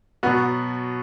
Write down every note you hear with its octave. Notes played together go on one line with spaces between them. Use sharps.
B2 F#3 B3 F#4